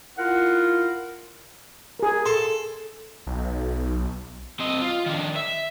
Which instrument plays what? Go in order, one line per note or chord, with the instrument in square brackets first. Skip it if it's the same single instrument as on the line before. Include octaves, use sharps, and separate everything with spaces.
[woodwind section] E4 F4 A#4 F5 F#5
[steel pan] G#4 A#4
[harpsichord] A4 [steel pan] C6
[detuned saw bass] B1
[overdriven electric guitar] C4 D#5
F4
D#3 D4
E5